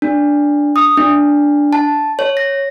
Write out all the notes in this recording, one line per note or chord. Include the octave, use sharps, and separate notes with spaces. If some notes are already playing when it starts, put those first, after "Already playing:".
D4
D#6
D4
A5
C#5
A#6